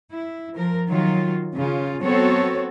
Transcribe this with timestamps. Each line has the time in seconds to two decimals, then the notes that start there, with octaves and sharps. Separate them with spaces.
0.12 E4
0.55 F3 A#4
0.89 D#3 F#3 F4
1.55 C#3 F4
2.01 F#3 B3 C4 F#4 A4 C#5